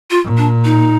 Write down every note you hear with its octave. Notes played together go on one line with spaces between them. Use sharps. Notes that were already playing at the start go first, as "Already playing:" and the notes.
F4
A#2
D4
D#4